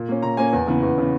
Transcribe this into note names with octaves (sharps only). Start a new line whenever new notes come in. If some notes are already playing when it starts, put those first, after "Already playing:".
Already playing: A#2
A#3 C#4
A#2 A#5
A#3 C#4 G#5
E2
C#3 E3 B3
E2
C#3 E3 B3